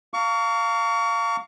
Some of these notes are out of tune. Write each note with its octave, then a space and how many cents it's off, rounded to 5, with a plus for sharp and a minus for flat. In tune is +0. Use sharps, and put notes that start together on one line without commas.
F5 +0 A#5 -40 C#6 +35